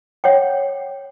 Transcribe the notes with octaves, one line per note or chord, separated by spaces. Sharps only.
C#5 F#5 G5